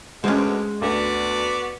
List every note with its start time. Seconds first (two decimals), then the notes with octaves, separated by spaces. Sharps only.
0.24 D2 B2 G#3 C#4 C5
0.82 D2 B3 F#4 D5